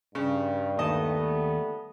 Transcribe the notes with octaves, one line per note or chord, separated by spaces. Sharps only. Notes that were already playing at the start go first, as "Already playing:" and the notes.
G2 C#3
D#2 D#3 G3 A3 B3 D#5 A5